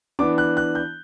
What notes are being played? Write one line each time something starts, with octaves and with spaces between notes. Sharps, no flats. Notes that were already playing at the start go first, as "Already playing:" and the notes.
E3 B3 D4 D6
F#6
F#6
G6